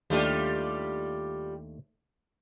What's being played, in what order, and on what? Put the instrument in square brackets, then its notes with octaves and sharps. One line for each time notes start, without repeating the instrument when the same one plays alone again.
[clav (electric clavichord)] D#2 A3 D4 [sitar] G3 F4 G4